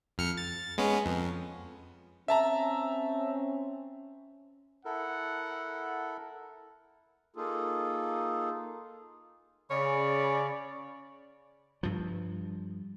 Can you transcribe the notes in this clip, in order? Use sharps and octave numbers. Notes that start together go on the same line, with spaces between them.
F2 F6 C#7
A6
G#3 B3 C#4
F2
C4 C#4 E5 A5 A#5
E4 A4 A#4 F#5
A#3 D#4 F4 G#4 A4
C#3 C#4 G#4 C#5 D5 B5
G2 F3